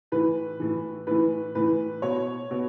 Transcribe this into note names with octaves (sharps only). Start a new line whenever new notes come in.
A2 E3 B4
A2 E3
A2 E3 B4
A2 E3 B4
B2 C#5
B2